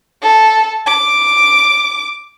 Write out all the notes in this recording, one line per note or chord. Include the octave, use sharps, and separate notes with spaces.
A4
D6